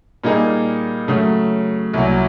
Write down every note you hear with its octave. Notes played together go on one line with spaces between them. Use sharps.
A#2 G3 A#3 D#4 G#4
C#3 F#3 A3
C2 A#2 F#3